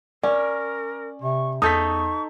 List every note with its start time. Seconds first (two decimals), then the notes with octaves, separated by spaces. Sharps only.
0.23 C#4 A#4 D5
1.21 C3 C#6
1.62 E2 D#4 A4 C#6 D#6 G6 B6